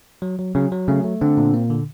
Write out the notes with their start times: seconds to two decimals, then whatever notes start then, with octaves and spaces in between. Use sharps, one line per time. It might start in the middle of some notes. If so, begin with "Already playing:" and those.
0.22 F#3
0.39 F#3
0.55 C#3 F#3
0.72 F#3
0.88 C#3 A3
1.04 A3
1.21 D3 C4
1.37 A#2
1.54 A#3
1.70 D3